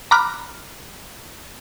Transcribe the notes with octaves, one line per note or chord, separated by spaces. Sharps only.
A#5 B5 D6 F6 F#6